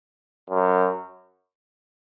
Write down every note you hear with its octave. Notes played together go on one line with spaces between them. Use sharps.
F#2